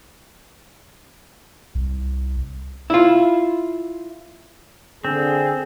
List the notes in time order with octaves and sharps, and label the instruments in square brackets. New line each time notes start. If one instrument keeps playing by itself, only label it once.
[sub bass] C2
[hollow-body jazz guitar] E4 F4
[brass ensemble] D3 G#4 [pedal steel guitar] C4